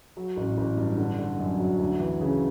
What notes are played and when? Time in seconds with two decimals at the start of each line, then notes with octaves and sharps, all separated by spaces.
0.17 F#3
0.37 A1
0.58 A1
0.77 G2
0.98 D3
1.19 D3
1.39 F#2
1.60 F#3
1.79 D2
2.00 E3
2.21 C#3